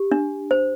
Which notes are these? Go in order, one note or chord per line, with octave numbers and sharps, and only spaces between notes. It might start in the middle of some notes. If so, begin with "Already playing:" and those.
Already playing: G4
D4
C5